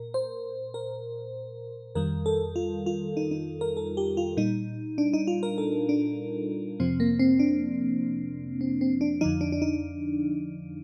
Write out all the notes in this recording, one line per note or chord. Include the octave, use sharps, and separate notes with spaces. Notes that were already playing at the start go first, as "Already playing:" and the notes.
Already playing: A#2 A#4
C5
A#4
F2 D#3 G3 A#4
A4
F4
F4
D#4
D#4
A#4
A4
G4
F4
A#2 G3 D#4
D4
D#4
F4
A#4
A4
D4
F2 C3 F3 C4
A#3
C4
D4
C4
C4
D4
F2 D3 F3 D#4
D4
D4
D#4